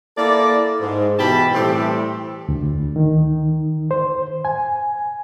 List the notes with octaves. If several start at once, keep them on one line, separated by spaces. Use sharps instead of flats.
A#3 E4 A4 D5
G#2
B2 E3 G4 G5 A5 B5
A2 E3 G3 C4 G4 A4
D2
D#3
C5
G#5